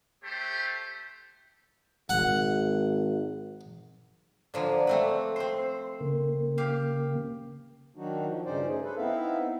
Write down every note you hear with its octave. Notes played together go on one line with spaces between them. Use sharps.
A3 G4 C5
G#1 F#5
D3 F3 F#3 D5
A3 C4 B4
C4 C5 C6
C#3 A#3
G4 F5
D#3 F#3 D4 D#4 F#4
F3
G2 C#3 C#4 D#4 C5 D5
A3 C#4 G#4
A4 B4
B3 C4 D#4 E4 E5 F5